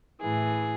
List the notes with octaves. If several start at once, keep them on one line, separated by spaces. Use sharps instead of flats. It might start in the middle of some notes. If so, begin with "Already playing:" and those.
A2 E3 G#4